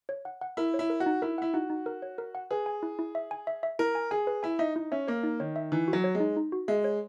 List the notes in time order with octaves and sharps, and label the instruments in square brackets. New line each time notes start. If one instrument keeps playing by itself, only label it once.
[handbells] C#5
F#5
F#5
[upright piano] E4 [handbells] A#4
[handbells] C#5
[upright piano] E4
[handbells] A#4
[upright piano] F#4
[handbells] D#4
[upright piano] E4 [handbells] A#4
[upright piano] E4 [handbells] F#5
[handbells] D#4 [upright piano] F#4
[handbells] D#4
A#4
C#5
A#4
F#5
[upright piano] G#4 [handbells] B4
[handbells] G#5
E4
E4
E5
G#5
E5
E5
[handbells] E4 [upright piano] A#4
[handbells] G#5
[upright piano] G#4 [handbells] G#5
[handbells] B4
[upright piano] E4 [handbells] G#5
[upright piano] D#4 [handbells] E5
[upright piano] D#4 [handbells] E4
[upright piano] C#4 [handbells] E5
[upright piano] A#3 [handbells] C#5
[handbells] D#4
[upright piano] D#3 [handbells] C#5
[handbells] E5
[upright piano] E3 [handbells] D#4
[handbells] F#4
[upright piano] F#3
[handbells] C#5
[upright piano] G#3
[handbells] D#4
D#4
F#4
[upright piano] G#3 [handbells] E5
[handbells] C#5